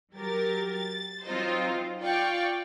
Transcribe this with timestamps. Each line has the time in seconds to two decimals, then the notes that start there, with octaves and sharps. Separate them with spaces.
0.15 F#3 G4 A#4 A6
0.74 A6
1.25 F#3 C4 D#4 F4 C5
2.00 F4 D5 F5 G5 C#6